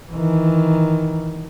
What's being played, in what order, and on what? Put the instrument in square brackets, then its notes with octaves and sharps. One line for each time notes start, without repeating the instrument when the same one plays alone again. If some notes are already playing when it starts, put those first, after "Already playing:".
[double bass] D#3 E3